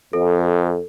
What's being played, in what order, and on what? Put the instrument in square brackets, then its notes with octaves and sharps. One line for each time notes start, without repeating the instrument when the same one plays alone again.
[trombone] F2 [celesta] A4